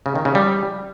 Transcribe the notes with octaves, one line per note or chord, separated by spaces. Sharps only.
C#3
D#3
C#3
G3